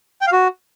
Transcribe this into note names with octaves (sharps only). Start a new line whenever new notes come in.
G5
F5
F#4